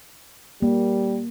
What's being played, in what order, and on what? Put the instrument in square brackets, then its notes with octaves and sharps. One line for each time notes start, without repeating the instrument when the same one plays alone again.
[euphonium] G3 [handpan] A#3